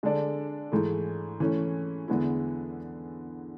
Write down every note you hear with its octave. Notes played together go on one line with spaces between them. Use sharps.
D3 G#3 D4 A4 D5
G#2 E3 A3
E3 A3 C#4
E2 D3 G#3 B3 E4